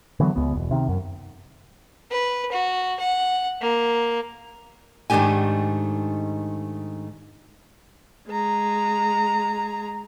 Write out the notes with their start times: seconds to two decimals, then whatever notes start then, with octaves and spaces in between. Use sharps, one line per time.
0.20 D3 E3 F#3 B3
0.36 C#2 B3
0.55 E1
0.71 C3 D#3
0.89 F#2
2.11 B4
2.52 F#4
3.00 F#5
3.61 A#3
5.10 G#2 D#3 A3 D4 G4 G#5
8.29 G#3 A#5